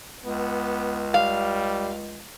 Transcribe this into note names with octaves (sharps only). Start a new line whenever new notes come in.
C#2 B3
G3 F5